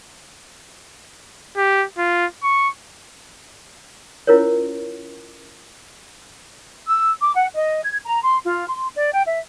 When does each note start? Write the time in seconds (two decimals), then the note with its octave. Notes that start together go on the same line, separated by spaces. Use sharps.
1.57 G4
1.98 F4
2.43 C#6
4.27 C#4 E4 F4 A#4 C5 C#5
6.86 E6
7.21 D6
7.34 F#5
7.54 D#5
7.83 G#6
8.05 A#5
8.22 C6
8.44 F4
8.68 C6
8.96 D5
9.13 G5
9.26 E5